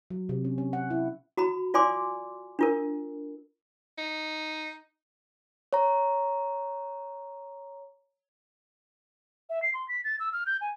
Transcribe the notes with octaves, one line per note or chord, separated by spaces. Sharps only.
F#3
C3
C#4
C#4
F#5
E4
F#4 A#5 B5
F4 D5 G#5 C6 D6
D4 F4 A#4
D#4
C#5 A#5
E5
C7
C6
B6
A6
E6
F6
G6
G#5